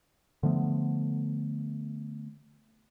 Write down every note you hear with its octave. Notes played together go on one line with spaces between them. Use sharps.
D3 F3 A3 B3